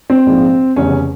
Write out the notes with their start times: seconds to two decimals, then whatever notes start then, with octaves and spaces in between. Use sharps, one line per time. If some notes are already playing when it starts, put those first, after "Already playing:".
0.10 C4
0.26 A#1 G#2 F3 G#3
0.76 F1 E2 C#3 C#4